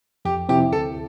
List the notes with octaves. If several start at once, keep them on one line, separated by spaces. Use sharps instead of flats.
F2 G4
C3 F3 C4 E4 G4
D2 A4